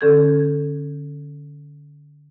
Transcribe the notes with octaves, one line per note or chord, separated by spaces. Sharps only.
D3 C#4 A4 G6 G#6